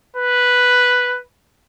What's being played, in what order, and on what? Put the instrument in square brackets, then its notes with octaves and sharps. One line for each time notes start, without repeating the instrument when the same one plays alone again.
[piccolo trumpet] B4